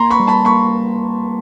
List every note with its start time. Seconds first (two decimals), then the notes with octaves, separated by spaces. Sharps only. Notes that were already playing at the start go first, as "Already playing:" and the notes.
Already playing: A#3 A#5 C6
0.10 B5 C#6
0.20 G3
0.27 A5 B5
0.45 A#3 B5 C#6